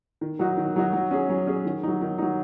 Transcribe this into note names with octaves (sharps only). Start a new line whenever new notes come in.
D#3
F#3 D#4 F#4
D#3
F#3 D#4 F#4
F#3
C#4 G#4
F#3
C#4 G#4
D#3
F#3 D#4
D#3
F#3 D#4